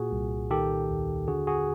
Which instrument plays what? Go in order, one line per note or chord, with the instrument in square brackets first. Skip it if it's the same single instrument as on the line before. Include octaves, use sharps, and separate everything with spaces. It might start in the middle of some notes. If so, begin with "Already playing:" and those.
Already playing: [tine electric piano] A#2 F#4 G#4
C2
D#3 G4 A4
D#2
D3 F#4 G#4
F#4 G#4